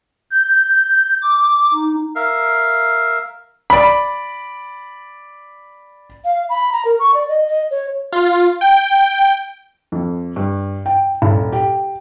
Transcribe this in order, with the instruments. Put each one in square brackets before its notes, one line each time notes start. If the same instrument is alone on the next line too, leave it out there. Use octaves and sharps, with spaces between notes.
[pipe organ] G6
D6
D#4
[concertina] A#4 E5 F5
[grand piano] D5 B5
[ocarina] F5
B5
A#5
A#4
C#6
D5
D#5
D#5
C#5
[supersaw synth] F4
G5
[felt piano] F2
G2
G5
D#1
G4